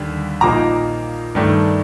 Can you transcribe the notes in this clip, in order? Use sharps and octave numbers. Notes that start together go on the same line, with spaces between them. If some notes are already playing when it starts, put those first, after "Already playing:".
Already playing: D#2 D3 G3
A#1 A#2 F3 A#3 D#4 A#5 D6
G2 D#3 A3 D4